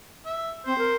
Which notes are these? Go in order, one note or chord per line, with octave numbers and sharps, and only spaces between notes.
E5
C4 C5
A#4